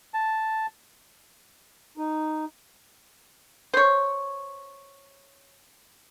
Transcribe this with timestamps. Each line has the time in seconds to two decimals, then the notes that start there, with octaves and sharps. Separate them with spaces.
0.14 A5
1.97 D#4
3.74 C5 C#5